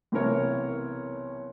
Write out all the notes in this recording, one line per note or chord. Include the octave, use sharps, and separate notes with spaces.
B1 C3 E3 A#4 C#5